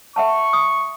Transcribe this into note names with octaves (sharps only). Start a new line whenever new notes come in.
E5 F#5 A5 C#6
D#6